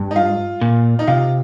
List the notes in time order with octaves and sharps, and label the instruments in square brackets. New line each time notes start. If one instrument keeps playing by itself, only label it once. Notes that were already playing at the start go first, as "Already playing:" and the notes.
Already playing: [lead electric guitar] G2
[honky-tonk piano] D#4
F4
[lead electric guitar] A#2
[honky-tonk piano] D#4
[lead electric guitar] C3 [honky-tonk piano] F4